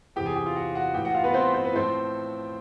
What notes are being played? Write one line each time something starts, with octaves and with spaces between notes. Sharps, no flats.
E2 C3 E3 G4 G5
G#4 G#5
G4 G5
F4 F5
F#4 F#5
F#4 F#5
A2 E3 G4 G5
F#4 F#5
F4 F5
B3 B4
C4 C5
C5
B4
A2 F3 C4 C5